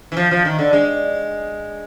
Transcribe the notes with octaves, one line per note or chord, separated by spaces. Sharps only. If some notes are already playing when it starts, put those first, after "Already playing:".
E3
F3
F3
D#3
D3
G#3